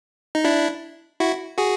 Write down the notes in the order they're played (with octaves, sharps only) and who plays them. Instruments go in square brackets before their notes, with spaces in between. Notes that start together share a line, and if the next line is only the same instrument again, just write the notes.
[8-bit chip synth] D#4
D4 E4
E4 F#4
F#4 G#4